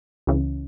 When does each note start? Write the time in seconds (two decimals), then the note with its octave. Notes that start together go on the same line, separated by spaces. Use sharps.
0.27 C#2 C#3 E3